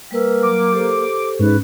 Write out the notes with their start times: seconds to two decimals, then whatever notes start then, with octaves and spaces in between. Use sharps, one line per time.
0.11 G3 A#3 B4 E6
0.43 F#3 D6
0.73 G4 A4 C5
1.39 G#2 C#4 B4